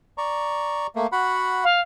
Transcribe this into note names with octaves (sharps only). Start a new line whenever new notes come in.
D5 A#5 C#6
A3 A#3
F#4 F#5 B5
F5